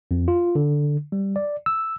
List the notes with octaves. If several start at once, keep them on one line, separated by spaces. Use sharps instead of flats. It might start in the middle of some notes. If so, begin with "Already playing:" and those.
F2
F4
D3
G3
D5
E6